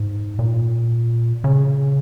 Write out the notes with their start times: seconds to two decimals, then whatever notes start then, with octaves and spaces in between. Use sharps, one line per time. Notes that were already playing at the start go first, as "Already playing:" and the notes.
Already playing: G#2
0.39 A#2
1.44 C#3